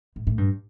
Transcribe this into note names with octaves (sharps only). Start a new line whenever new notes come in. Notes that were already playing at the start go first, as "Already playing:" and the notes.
A2
A2
G2